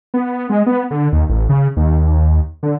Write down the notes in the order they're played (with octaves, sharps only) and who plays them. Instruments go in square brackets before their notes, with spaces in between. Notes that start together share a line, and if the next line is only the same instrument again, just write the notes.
[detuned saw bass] B3
G#3
B3
D3
D#2
A1
C#3
D#2
D3